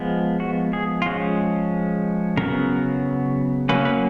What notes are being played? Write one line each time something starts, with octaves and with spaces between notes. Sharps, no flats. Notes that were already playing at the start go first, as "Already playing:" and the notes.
Already playing: F3 G#3 B3
F#4
G#4
F4
F3 G#3 C#4 F#4
C#3 F#3 B3 A#4
F#3 A#3 C#4 B4
B4